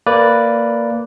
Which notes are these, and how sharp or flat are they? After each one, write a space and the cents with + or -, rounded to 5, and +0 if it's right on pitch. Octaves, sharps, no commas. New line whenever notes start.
A#3 -15 B4 +0 D5 +0